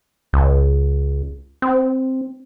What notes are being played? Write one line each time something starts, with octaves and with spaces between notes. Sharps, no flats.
C#2
C4